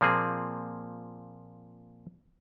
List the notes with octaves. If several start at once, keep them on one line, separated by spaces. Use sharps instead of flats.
A#2 F3 A#3 C4 G#4